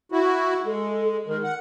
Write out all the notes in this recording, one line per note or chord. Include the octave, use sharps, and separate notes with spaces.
E4 F#4
G#3 A4
D#3 G#3 A#4
F#5